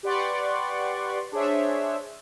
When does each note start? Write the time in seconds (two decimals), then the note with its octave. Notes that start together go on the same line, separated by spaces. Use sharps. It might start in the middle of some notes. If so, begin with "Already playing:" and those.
0.03 G4 B4 D5 F#5 C6 C#6
1.32 D4 G#4 C5 C#5 E5